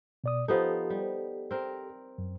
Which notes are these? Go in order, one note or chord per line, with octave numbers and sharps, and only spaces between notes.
B2 D5 D#6
F3 B3 D#4 G4 A4
G3
C4 A#4
F#2